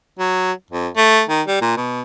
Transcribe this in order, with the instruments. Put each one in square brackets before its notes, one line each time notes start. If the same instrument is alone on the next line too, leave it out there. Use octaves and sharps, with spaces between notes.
[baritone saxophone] F#3
F2
A3
D#3
G3
A#2
B2